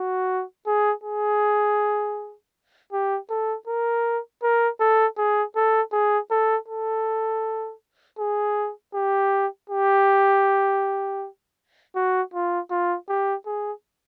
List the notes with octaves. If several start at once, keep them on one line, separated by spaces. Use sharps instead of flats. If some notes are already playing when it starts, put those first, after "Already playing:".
Already playing: F#4
G#4
G#4
G4
A4
A#4
A#4
A4
G#4
A4
G#4
A4
A4
G#4
G4
G4
F#4
F4
F4
G4
G#4